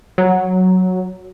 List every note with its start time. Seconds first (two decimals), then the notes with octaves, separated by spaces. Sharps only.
0.18 F#3